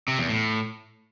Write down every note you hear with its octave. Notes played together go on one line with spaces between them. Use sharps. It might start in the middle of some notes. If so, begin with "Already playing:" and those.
C3
E2
A2